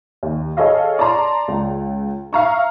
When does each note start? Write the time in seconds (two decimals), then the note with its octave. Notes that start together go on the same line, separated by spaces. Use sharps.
0.23 D#2
0.57 G#4 A4 C#5 D#5 F5
0.99 D5 A5 A#5 C6
1.48 C#2
2.33 E5 F5 A#5 C#6